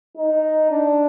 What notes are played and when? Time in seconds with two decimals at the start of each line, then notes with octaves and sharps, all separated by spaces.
0.17 D#4
0.71 D4